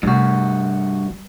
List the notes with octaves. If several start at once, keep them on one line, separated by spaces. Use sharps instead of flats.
G2 C3 A3 F#4
G3